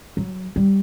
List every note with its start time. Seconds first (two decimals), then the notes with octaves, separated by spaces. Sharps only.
0.17 F#3
0.56 G3